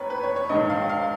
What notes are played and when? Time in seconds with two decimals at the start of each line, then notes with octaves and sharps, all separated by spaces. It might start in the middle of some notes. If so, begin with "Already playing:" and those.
Already playing: F1 D#2 B4 C#5 A#5
0.10 B4
0.23 C#5
0.36 C#5
0.49 A#1 G#2 D#3 D#5
0.70 F5
0.89 F5